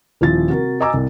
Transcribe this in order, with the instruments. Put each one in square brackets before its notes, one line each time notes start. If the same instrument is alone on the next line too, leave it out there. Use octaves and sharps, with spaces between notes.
[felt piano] D#1 F3 E4 A6
C3 F#4 A#4
F#4 D#5 G#5 A#5 D6 E6
C2